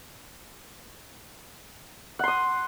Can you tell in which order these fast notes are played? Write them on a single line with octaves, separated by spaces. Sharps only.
F#5 C6 D#6